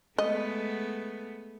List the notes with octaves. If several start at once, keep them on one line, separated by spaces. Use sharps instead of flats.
G#3 A3 B3 D#5